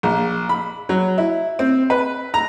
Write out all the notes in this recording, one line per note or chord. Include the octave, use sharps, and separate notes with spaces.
A#1
B5
F#3
E4
C4
B4
A#5